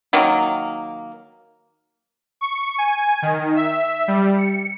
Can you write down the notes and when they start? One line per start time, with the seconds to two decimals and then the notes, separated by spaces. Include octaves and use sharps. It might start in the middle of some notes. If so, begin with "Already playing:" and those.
0.13 D#3 F#3 A#3
2.41 C#6
2.78 G#5
3.22 D#3
3.56 E5
4.08 G3
4.38 C#7